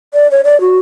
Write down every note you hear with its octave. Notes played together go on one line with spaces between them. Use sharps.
D5
C#5
D5
F#4